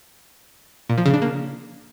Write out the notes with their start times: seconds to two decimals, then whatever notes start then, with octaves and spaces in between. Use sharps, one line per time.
0.90 A#2
0.98 F3
1.06 C#3
1.14 D4
1.22 A#3